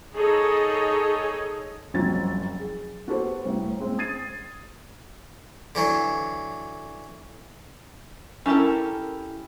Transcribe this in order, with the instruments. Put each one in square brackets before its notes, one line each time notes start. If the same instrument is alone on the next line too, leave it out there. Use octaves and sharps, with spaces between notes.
[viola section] D#4 G#4 A4 C#5 D#5
[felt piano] F#1 C2 F3 F#3 C4 A6
G#4
B3 F#4 G4 A4 B4 C5
C2 A2
G#3 C4
D#6 G#6 A6 C7 D#7
[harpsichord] D3 E3 F#3
[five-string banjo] C#4 E4 G4 A4 A#4